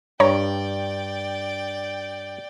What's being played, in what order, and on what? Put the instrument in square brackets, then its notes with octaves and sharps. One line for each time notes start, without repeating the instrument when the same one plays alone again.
[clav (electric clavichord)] G2 [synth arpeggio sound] C#5 A#5 [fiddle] D5 G5